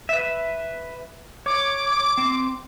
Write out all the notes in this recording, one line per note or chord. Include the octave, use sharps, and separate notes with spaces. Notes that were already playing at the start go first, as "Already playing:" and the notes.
B4 E5
C#5 D6
C4